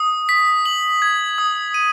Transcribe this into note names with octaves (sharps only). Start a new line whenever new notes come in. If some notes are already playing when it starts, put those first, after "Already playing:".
Already playing: D#6
B6
F#7
G#6
D#6
D#7